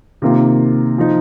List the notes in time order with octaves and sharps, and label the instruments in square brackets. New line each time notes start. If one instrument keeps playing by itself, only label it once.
[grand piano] C3 D#3 A#3 F4
F3 D#4